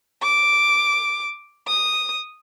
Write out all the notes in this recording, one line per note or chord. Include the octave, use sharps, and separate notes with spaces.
D6
D#6